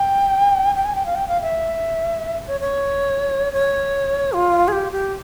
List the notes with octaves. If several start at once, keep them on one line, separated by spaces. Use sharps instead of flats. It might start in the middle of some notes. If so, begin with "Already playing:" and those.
Already playing: G5
G5
G#5
G5
F5
G5
F5
E5
C#5
C#5
C#5
F4
G#4
G4
G4